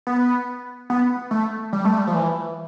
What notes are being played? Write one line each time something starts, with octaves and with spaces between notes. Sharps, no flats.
B3
B3
A3
G3
A3
G3
F3
E3